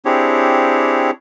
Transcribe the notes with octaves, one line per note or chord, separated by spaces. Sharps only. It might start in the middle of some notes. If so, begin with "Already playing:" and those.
C4 D4 E4 G4 G#4 C#5